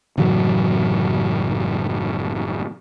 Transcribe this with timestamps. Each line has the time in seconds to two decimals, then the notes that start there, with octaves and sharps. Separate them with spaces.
0.18 F#1 A2 E3 F#3